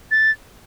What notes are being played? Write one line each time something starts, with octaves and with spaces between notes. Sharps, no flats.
A6